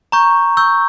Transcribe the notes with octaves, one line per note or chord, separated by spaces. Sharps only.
A#5 C#6 G6
C#6 E6 G6